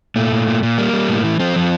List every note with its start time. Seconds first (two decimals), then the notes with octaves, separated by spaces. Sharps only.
0.16 A#2 A3
0.32 A#2
0.48 A#2
0.63 A#2
0.78 G3 A#3
0.93 G3
1.09 A2
1.24 E3
1.40 F3 C4
1.56 F3